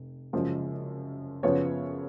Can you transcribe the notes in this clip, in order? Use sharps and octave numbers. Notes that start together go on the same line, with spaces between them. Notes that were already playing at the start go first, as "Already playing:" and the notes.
Already playing: F1
F#1 F#2 F3 G#3
F#2 C#3 F3 B3 C#5